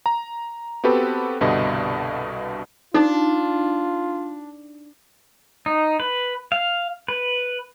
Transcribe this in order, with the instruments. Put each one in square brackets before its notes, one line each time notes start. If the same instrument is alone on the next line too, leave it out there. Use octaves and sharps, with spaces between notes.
[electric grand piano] A#5
B3 C4 F#4 G4 A4 B4
C2 G2 B2 D3 D#5
[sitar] D4 [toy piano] D#4 [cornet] F4
[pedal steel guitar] D#4
B4
F5
B4